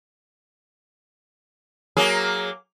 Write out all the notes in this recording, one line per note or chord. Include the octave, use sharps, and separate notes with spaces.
F#3 A#3 G#4